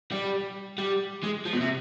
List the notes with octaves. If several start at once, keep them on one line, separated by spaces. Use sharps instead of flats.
G3
G3
G#3
F3
B2
C3